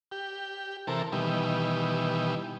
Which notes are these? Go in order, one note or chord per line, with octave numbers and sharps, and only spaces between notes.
G4
C3 E3 A4 A#4
B2 D#3 E3 G3